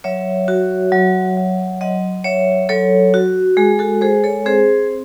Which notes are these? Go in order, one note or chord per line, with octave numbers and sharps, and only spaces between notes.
F#3 C#5 E5
F#4
F#3
F#3
F#3 D#5 F#5
F#3 C#5 E5
F#3 A4 C#5
F#4
G#3 G#4
F#4 A4
G#3 G#4 C5
A4 C#5
C4 G#4 C5